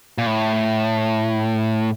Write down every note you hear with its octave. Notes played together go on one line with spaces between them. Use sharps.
A#2
A2